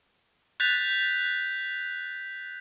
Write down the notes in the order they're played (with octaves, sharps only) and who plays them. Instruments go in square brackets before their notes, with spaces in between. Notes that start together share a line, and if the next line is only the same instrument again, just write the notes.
[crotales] F#6 G6 A6 B6 F7